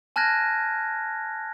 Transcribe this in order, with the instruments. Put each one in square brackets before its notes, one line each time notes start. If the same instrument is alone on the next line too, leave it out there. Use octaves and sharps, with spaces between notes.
[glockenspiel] G#5 A5 F6 F#6 G#6 A#6